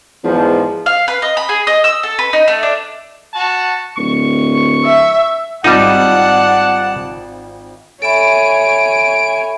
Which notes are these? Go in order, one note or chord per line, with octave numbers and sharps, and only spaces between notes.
E2 G#2 F3
F5
B4
D#5
B5
G#4
D#5
E6
A4
B4
D#4
A3
D4
F#4 A5
D1 C#6
E5
G#1 G3 D#4 F4 D5 F#5 A5 D#7
A4 C#5 E5 G#5 B5 D7